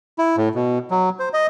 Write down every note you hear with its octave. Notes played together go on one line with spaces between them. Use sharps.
E4
A2
B2
F#3
C5
D#5